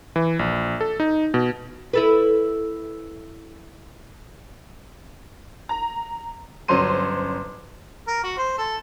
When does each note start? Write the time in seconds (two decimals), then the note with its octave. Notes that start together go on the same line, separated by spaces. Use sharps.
0.16 E3
0.39 A#1
0.81 A4
1.00 D#4
1.34 B2
1.93 E4 A4 B4
5.69 A#5
6.68 G1 F#3 C#4 C5 C6 D#7
8.08 A#4
8.24 F#4
8.38 C5
8.58 A4